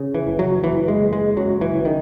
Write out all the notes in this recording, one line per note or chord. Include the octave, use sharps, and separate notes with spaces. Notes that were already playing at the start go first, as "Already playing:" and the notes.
Already playing: C#3
E3
F#1
F#3
F#1 E3
G#3
F#1
G#3
F#2 F#3
E3
F#1
D#3